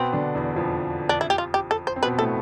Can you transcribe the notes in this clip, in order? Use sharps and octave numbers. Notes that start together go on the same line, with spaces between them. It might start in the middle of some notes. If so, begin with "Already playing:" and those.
Already playing: B2 B3 C4
D3 D4
E2 E3
F2 F3
D4
E4
G4
F4
G4
A4
C5
C4
B2 B3 B4
A2 A3 A4